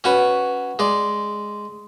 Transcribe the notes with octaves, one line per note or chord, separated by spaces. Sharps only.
C#4 F#4 B4
G#3 D5